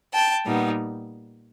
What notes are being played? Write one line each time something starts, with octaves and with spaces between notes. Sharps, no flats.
G5 A5
A#2 G3 B3 D#4